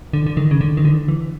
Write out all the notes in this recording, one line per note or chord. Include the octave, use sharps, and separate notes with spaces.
D3
D3
D#3
C#3
D3
D#3
D3
E3